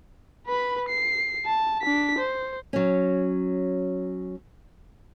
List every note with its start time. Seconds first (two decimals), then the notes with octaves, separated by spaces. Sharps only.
0.47 B4 B5
0.89 C7
1.46 A5
1.82 D4 B6
2.19 C5
2.73 F#3 C#4